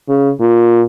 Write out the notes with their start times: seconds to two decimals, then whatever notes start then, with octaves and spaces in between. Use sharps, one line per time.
0.09 C#3
0.40 A#2